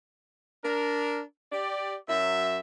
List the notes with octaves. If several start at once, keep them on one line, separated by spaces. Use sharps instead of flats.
D4 A#4
G4 D5
F#2 F#3 E5